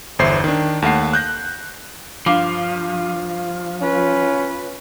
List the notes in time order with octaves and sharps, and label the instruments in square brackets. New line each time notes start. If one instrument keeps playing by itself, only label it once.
[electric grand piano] G1 E2 C5 E5 C7
D#3 D4
D#2 A3 F#5 C7
F#6 G6 A#6
[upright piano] G2 F5 D6 [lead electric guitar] F3
[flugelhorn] C#4 [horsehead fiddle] F4 B4